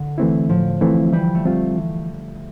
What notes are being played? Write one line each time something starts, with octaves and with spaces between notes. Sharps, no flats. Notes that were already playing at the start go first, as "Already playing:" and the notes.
Already playing: D3
E3 A3 C4 E4
A2 F3
E3 A3 C4 E4
E3 G3
A3
G3 C4 F4
E3